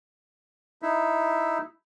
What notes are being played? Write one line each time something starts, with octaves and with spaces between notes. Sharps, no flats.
D#4 E4 E5